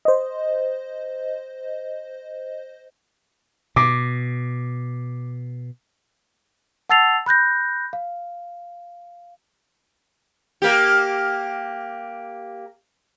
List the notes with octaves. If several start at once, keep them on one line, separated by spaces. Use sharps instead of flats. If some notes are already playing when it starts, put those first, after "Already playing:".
C5 D#5
B2 D6
F#5 A5 E6 A6 C7 F7
B5 F#6 G6 A#6
F5
A#3 G4